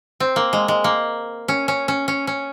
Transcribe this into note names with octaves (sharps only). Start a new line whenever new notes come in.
C4
A#3
G#3
G#3
A#3
C#4
C#4
C#4
C#4
C#4